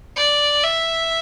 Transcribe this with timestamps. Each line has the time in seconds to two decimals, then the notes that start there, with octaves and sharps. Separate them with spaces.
0.16 D5
0.63 E5